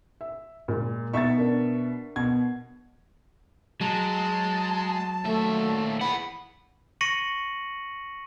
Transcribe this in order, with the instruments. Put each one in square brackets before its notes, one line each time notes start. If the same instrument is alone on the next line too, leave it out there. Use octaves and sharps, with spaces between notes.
[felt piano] E5
A#2 G#3
[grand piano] B2 E5 C#6 [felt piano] D#4 A6
[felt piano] D4 A#4
[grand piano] B2 G#6
[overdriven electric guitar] F#3 [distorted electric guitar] G#3 [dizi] A5
[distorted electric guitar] D#2 E5 [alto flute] A3
[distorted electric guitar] E2 B3 [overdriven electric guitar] F#5 [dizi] B5
[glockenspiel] C#6 A#6 C#7 D#7 F#7